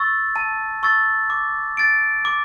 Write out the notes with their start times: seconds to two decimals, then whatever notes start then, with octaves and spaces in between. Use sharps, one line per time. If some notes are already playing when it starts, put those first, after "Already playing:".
Already playing: C#6 E6 A6
0.36 A5
0.83 C#6 E6 A6
1.30 D6
1.77 A6 D7
2.25 D6